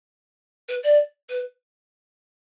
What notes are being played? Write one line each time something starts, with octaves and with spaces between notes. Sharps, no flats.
B4
D5
B4